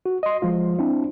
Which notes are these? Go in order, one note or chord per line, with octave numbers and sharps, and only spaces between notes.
F#4
D#5 C6
F3 G#3 F4
C4 D4 E4